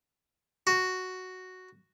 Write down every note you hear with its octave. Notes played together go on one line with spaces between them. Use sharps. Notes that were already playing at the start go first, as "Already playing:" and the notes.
F#4